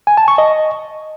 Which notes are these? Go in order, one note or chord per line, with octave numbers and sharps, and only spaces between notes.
G#5
A5
C#6
D#5